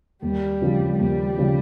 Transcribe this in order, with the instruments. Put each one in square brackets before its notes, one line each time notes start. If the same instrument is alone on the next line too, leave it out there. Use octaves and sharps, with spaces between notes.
[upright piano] D#2 [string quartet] G3
[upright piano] C#3 F3
[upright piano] D#2 [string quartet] G3
[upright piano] C#3 F3